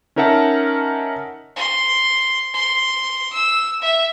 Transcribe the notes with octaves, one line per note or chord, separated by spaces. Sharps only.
C#4 D#4 A#4 E5 F#5 A5
C6
C6
E6
E5